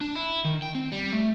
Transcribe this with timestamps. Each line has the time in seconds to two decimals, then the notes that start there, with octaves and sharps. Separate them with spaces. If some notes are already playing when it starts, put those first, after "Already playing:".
0.01 D4
0.15 E4
0.45 D#3
0.62 G5
0.75 C4
0.92 G3
1.12 A3